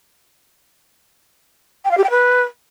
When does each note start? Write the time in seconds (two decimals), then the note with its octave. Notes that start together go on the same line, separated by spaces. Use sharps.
1.85 G5
1.91 F5
1.97 G4
2.04 G5
2.10 B4